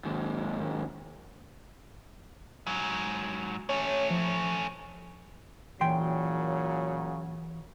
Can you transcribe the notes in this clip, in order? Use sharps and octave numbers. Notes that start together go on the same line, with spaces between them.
D#2 G#2
G#2 F#3
A3 C#4 C#5
F3
A#2 C#3 E3 F#3 G5 C6